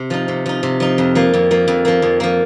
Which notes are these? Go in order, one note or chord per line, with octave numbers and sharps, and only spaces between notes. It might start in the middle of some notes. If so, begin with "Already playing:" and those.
Already playing: C3
F3 D#4
C3
F3 D#4
C3
F3 D#4
F2
F3 A#3
F2
F3 A#3
F2
F3 A#3
F2
F3 A#3